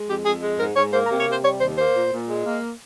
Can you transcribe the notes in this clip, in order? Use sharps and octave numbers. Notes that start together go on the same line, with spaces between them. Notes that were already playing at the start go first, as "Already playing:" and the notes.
Already playing: G#3
F2 G4
F2 G#4
G#3
G#2 A#4
G#2 C#5
A#3 C5
A#4
C3
C#5
C3 C5
G3 C#5
D#2 C5
A#3 C5
A#2
A#2
G#3
A#3